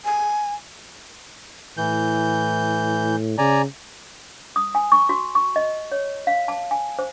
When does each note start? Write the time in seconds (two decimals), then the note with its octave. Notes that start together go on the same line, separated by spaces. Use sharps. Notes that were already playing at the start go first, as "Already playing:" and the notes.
0.05 G#5
1.78 A2 E3 G6
3.38 C#3 D5 G#5 A#5
4.56 D#6
4.75 G#5
4.92 C#6
5.09 F#4
5.35 C#6
5.56 D#5
5.92 C#5
6.27 F5
6.48 A5
6.71 G#5
6.99 C5